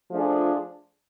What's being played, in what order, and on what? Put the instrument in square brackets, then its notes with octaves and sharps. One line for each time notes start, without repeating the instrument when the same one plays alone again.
[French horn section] F3 A3 D4 F4 G#4